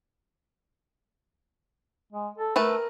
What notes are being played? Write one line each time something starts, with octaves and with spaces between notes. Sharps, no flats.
G#3
A4
A3 A#4 B4 A5